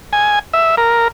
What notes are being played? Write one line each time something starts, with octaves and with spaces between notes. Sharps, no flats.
G#5
E5
A#4